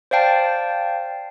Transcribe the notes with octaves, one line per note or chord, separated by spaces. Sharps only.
C5 D5 F5 G5 A5